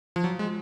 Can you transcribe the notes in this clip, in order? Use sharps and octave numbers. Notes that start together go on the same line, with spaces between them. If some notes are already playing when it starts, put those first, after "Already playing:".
F3
F#3
G#3